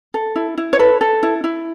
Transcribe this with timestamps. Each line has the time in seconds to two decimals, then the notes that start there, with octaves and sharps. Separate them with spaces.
0.14 A4
0.36 E4
0.58 E4
0.73 C#5
0.79 A4 B4
1.01 A4
1.23 E4
1.44 E4